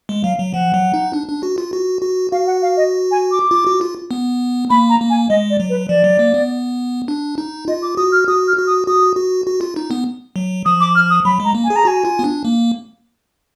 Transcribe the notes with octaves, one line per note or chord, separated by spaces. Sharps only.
G#3
F#3 F5
F#3
F3 F#5
F#3
D#4
D4
D4
F#4
F4
F#4
F#4
F#4 F5
F#5
F5
D#5
G#5
D6
F4
F#4
F4
B3
A#3 B5
A#5
A#3
G#5
G#3 D#5
D5
F#3
B4
F3 D5
F#3
A#3
B3
D4
D#4
F4 D#5
D6
F#4 D#6
F6
F#4 D#6
F6
F#4
D#6
F#4 D#6
F#4
F#4
F4
D#4
B3
F#3
F3 D#6
D6
F6
D#6
F#3 B5
G#3
A#5
A#3
G#5
G#4
A#5
F#4 G#5
F4
B3
D4
A#3